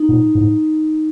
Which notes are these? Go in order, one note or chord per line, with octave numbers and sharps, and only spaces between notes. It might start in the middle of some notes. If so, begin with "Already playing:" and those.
Already playing: D#4
A#2
A2